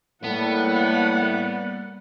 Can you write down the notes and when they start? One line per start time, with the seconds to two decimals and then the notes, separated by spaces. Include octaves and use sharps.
0.24 A2 G3 A#3 B3 F#5